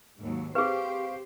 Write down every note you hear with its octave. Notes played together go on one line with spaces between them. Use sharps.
D#2 G#2 F#3
C4 G4 G#4 B4 C5 F5 C#6